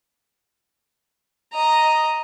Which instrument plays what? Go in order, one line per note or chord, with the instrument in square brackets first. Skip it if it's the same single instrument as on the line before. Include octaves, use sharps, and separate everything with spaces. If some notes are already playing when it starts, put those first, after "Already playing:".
[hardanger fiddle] D#5 A#5